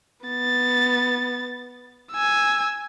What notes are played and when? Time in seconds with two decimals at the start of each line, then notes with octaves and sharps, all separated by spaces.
0.26 B3 A6
2.12 G#5 E6